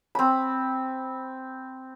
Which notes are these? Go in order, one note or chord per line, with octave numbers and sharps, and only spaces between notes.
C4 B5